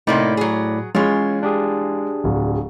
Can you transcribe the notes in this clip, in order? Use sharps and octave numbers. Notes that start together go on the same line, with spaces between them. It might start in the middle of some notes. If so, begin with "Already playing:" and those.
A2 C3 A#3 D#4 D5 B5
F#3 G#4
E3 G#3 C#4 F4 C#5
D4 G4 G#4
D1